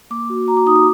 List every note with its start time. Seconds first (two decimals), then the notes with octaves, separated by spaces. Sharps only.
0.10 A#3 D6
0.30 F#4
0.47 F#4 A#5
0.57 D6
0.66 D#4 D#6
0.76 D6